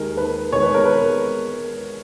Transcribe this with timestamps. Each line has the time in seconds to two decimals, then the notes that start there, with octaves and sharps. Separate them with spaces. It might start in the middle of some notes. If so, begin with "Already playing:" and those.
Already playing: D#2 D#3 G#3 A#4
0.17 B4
0.52 E1 E2 D#3 G#3 C#5
0.63 B4
0.74 A#4
0.85 B4